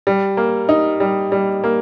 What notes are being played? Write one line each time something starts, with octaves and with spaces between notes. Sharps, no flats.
G3
A#3
D#4
G3
G3
A#3